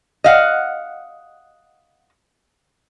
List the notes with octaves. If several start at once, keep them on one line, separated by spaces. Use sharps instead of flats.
D#5 F5 F#5